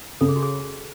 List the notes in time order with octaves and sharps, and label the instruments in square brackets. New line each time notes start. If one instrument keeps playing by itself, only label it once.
[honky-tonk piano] C#3 [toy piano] A4
[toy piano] G#4
F#4
G#4